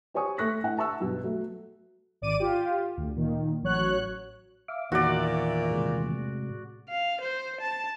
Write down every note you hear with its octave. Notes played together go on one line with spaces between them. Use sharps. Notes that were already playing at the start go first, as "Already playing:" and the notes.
G4 C5 C#5 G#5 C#6 D#6
A3 C#6 F#6 A#6 B6
A2 F#5
E5 A5 C#6 E6
B1 G2 B2
F#3 A3
G#1 D5 D6 D#7
F4 G4
D2
A#2 D#3
A1 F#3 C#5 F#6
E5 F5 D6
E2 A#2 D#3 F#4 D5 E5
A2 C3 G#3
F5
C5
A5